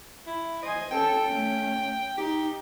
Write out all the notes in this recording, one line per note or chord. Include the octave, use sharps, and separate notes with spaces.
E4
C5 D#5 G#5
C#4 A4 G5
A3 C#4
D#4 G4